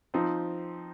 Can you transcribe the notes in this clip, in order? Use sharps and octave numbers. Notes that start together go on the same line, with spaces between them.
F3 C4 D#4